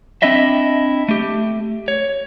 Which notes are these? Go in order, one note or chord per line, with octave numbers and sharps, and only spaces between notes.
C4 D4 E4 D#5 E5
A3 G4
C#5